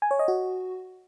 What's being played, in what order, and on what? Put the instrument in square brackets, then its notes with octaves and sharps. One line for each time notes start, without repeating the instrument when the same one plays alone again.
[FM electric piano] G#5
C#5
D#5
F#4